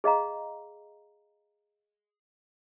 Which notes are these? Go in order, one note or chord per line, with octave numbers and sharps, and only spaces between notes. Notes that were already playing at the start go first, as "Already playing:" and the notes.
G#4 D#5 F5 A#5